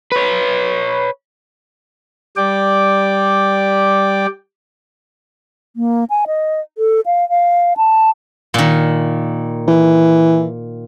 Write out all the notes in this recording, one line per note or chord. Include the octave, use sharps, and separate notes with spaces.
B4 C#5
G3 D5 G5 D6
A#3
G#5
D#5
A4
F5
F5
A5
A#2 D#3
E3